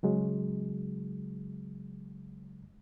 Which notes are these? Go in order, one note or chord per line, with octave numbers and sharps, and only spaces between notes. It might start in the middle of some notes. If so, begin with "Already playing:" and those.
C#3 F#3 G#3